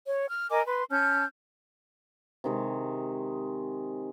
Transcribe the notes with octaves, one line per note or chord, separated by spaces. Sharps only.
C#5
F6
A#4 D#5 G#5 D6
B4 C6
C#4 A5 F6 G6
C3 D#3 G#3